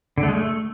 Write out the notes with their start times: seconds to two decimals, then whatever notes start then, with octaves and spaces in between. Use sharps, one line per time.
0.18 D3
0.23 A3
0.28 G#3
0.34 A3